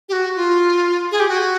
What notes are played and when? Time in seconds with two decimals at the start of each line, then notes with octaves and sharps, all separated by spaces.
0.09 G4
0.13 F#4
0.36 F4
1.12 G#4
1.20 G4
1.29 F#4